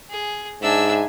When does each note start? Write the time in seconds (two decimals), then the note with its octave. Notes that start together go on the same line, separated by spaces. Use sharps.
0.10 G#4
0.62 G#2 D4 E5 G#5 E6